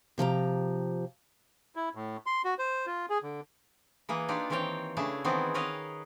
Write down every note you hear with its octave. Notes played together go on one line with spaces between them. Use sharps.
C3 F3 G4 A#5
E4
A2
C6
F#4
C5
F4
G#4
D3
E3 A#3 G#4 B4
D4 D#4 F4 G4 D5
D#3 E3 C4 C#5 F5 G5
C#3 A3 D4 E4 G#4 A5
D#3 E3 B3 C4 F#4 G#4
A#4 B4 C#5 D#5 F5 F#5